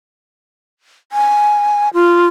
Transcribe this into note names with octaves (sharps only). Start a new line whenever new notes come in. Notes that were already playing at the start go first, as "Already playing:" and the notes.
G#5
F4